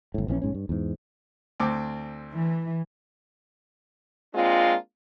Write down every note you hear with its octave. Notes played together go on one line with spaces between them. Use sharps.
G1 A2
A#1 E3 C4 C#4
B1 G#2 C#4
G2
E2 G#2
D2 C4 D6
E3
G#3 A#3 C4 D4 F4